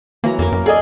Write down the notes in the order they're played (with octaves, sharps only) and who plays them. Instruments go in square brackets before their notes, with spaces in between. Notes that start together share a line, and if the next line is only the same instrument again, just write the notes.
[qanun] E3 F#3 A#5 [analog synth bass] A#3
[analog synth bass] F2 [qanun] A#3 A#4
[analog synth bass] F#2
[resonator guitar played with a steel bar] G#4 D#5 [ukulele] A4 D5 G#5